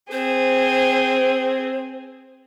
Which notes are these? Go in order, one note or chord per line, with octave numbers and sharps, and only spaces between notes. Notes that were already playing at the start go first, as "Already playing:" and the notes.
C4 G#4 C5